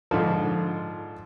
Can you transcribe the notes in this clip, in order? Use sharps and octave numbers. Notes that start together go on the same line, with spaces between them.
G#2 D3 F3